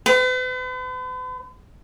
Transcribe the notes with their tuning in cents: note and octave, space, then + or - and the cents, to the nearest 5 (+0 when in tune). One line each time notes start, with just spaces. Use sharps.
B4 +45